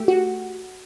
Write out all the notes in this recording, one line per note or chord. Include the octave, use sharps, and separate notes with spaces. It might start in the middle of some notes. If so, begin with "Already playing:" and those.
Already playing: A3 G4
F#4